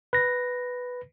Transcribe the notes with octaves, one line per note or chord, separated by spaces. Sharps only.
B4 A#6